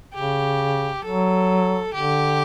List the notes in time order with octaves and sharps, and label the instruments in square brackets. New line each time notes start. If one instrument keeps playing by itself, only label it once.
[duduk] C#3 [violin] G4
[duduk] F#3 [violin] A4
[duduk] D3 [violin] G4